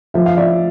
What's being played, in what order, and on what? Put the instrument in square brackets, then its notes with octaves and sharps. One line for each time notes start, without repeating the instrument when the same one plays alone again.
[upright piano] F3 E5
F5
D5 E5